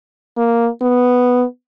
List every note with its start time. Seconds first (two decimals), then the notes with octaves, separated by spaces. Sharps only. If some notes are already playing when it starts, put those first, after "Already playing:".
0.37 A#3
0.81 B3